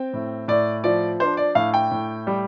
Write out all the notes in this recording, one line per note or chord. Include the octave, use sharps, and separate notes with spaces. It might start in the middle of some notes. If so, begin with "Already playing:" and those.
Already playing: C4 G5
A2
A2 D5
F3 D5
D4 C5
D5
A2 F5
G5
A2
G3